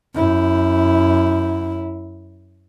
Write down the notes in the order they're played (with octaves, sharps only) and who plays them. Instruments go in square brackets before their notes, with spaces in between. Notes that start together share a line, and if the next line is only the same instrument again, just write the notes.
[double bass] F#2 E4